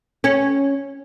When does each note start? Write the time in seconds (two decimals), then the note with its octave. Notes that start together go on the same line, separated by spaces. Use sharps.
0.24 C#4